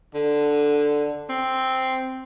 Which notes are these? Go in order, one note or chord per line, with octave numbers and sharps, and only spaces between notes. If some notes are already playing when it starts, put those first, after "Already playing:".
D3
C4